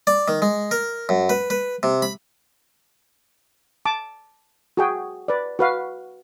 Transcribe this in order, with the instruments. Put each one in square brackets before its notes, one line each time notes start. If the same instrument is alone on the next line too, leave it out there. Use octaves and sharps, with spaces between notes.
[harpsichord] D5
D#3
G#3
A#4
F#2
B4
B4
C3
B5
[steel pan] A5 D6
F#4 G#4 G5
B4 D5
F#4 B4 F5